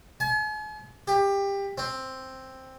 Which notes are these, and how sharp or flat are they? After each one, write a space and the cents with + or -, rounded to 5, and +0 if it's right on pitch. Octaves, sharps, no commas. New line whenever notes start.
G#5 +45
G4 +20
C4 +5